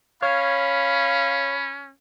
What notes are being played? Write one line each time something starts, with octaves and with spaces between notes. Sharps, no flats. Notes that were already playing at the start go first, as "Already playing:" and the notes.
C#4 C#5 F5 B5